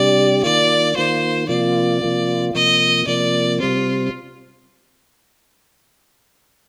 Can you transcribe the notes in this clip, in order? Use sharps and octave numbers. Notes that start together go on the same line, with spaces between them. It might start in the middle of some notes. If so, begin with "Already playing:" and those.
Already playing: C3 G3 D4 G4 D5
D#3 A#3 F4 D5
D#3 A#3 F4 C5
C3 F3 A#3 F4 D5
C3 F3 A#3 F4
C3 F3 A#3 D#5
C3 F3 A#3 D5
C3 G3 C4 F4